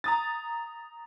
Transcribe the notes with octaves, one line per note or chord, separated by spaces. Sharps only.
A#5 D#6 A6